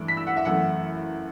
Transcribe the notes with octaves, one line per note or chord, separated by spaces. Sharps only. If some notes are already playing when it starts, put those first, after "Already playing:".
Already playing: G2 E3 A3 D4
B6
E6
F#5
E5
F#2 E3 A3 F#5